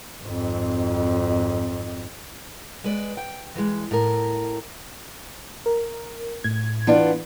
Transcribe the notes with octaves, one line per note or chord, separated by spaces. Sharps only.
G#1 F2
G#3 B4 D5
G5
E3 G#3
A2 A#4
A#4
A2 G#6
E3 B3 D4 F4